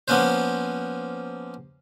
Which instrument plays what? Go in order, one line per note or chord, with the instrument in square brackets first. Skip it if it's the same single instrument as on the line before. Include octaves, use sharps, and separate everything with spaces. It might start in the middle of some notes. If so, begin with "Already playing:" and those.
[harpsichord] F3 A#3 B3 C#4 B4 C5